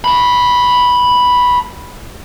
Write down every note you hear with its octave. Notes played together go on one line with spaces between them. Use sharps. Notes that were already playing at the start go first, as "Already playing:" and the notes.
A5 B5